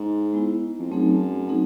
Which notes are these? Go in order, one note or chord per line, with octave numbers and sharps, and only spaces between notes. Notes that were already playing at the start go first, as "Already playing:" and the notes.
Already playing: G#2
G#3 B3 E4
F2
F#2 F#3 A3 C4 D#4 G#4
F#3 A3 C4 D#4 G#4